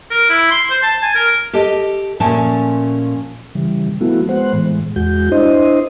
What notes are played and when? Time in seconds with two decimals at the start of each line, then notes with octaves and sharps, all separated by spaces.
0.11 A#4
0.30 E4
0.51 C6
0.70 C5
0.83 A5
1.02 G#5
1.15 A#4
1.53 G4 A4 D#5 A5
2.20 A#2 F3 A3 C#4 G#5 A5
3.55 C#3 E3 G3
4.01 F3 A3 B3 E4 F#4
4.29 G#3 B3 C5 F#5
4.53 A2 E3 G#3
4.96 E2 G#3 F#4 G6
5.32 D4 E4 C5 D#5